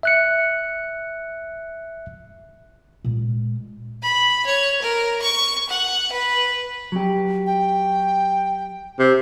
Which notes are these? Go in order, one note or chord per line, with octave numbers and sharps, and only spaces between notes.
E5 F#6 C#7
A#2 G#3
B5
C#5
A#4
C#6
F#5
B4
F#3 G4
G5
C3